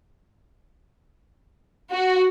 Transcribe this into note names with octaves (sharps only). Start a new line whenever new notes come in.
F#4